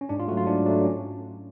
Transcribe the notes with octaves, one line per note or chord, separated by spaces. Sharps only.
C#4
G#2 D4
F4
F#3 A3 F#4
F4
G#2 D4
F#3 A3 D4
C#4